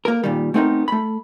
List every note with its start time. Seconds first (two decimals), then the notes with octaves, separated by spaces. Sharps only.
0.05 A#3 A#4
0.24 A#2 D#3 G3
0.54 A3 B3 C4 D#4 A4 A#4
0.88 A3 B5